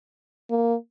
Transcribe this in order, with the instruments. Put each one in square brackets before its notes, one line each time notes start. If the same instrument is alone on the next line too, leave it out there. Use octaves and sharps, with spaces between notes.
[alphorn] A#3